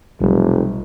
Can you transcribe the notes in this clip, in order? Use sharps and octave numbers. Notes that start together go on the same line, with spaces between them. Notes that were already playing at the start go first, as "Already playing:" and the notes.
F1 B1 F#3 G3